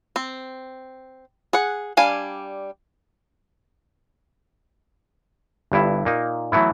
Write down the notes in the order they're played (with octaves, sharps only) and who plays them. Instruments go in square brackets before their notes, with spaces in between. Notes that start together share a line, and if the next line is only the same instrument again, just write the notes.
[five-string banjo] C4
G#4 F#5
G3 D4 F5 G#5
[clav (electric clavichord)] G1 G2 E4
A#2 A#3 D#4
E3 F#3 A3 B3 E4